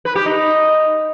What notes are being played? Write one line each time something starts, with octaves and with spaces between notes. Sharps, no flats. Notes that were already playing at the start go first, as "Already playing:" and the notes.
B4
G4
D#4